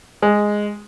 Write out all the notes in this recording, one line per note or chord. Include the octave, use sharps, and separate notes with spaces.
G#3